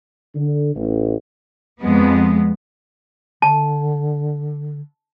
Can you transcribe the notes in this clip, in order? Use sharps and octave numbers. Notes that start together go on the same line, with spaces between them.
D3
A1
F2 G#3 B3
D3 A5